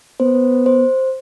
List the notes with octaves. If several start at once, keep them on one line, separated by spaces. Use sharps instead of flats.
B3 C5
C5